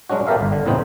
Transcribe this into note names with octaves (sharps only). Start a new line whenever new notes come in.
F#3 G#3 C#4 D4 F#4
B3 G4 A4 A#4 E5 F5
G1
D3
E2 A2 C#3 B3 C4 D#4